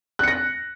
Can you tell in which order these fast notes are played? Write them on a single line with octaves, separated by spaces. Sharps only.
F#6 C#7 A#6